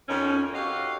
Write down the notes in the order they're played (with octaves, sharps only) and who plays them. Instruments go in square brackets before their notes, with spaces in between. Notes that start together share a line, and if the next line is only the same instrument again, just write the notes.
[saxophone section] F2 D#3 C#4
F#4 G4 A4 C#5 D#5 F5